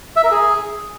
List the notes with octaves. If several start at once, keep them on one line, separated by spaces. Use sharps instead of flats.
E5
A#4
G#4